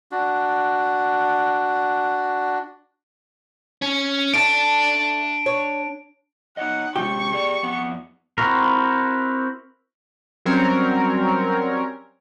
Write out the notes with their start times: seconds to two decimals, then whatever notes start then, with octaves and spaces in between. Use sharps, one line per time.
0.12 D4 F#4
3.82 C#4
4.34 A3 D4 A5 D7
5.46 C#5
6.57 D#4 C#5 D#5 F#5
6.96 C3 G3 G#3 G4 C#6
7.32 G#4 D5
7.63 F2 B3 F#5
8.38 C4 E4 F#4 A#4
10.45 F#3 G3 C4 C#4 A#4 C#5